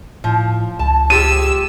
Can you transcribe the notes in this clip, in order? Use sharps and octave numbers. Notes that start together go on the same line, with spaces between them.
A2 F3
C#2 A5
F4 G4 G#4 E6 D#7